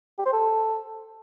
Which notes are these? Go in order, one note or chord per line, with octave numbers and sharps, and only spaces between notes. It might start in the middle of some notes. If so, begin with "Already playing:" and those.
G4
C5
A4